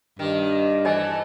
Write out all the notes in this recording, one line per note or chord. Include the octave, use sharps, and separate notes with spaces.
G2 D#3
E3 A3 C5 D#5 G#5